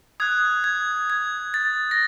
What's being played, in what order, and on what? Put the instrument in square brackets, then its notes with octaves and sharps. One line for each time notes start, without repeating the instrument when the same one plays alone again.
[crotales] D#6 F#6 G#6
G#6
G#6
A6
A#6